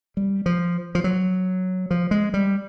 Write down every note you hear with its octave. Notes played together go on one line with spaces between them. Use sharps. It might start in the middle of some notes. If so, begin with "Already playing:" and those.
G3
F3
F3
F#3
F3
G#3
G3